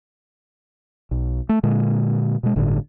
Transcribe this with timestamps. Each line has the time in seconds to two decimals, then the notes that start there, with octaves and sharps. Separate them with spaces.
1.11 B1
1.49 A3
1.63 A#2 D3 G#3
2.43 B2 G#3
2.56 G1 A2 D3